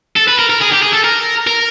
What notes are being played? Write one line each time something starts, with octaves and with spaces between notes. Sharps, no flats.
A4
B4
A#4
A#4
G#4
G4
G#4
A4
A#4
A#4